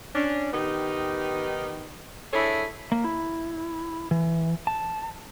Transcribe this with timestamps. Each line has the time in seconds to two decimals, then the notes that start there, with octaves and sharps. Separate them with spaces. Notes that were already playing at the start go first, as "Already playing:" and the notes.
0.15 C#4 D4
0.53 D#3 B3 D#4 G4
2.33 D4 E4 G#4 A4 C#5
2.92 A#3
3.04 E4
4.11 E3
4.67 A5